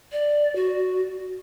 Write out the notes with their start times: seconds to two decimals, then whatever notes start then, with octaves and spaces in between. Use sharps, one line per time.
0.12 D5
0.56 F#4